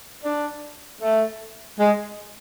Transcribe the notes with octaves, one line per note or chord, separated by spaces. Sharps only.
D4
A3
G#3